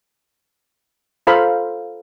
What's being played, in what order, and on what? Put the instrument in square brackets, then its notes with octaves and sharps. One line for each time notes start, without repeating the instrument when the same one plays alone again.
[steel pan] F4 A4 C5 F5 A#5 B5